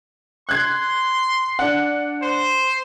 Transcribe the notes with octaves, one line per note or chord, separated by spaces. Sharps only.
C6 F#6 G#6
D4 F#5
C5